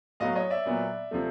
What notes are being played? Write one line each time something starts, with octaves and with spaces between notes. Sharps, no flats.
A2 F#3 B3 D#5 F5
C#5 D#5
D5 E5
A#2 F#3 B3
C3 F3 A3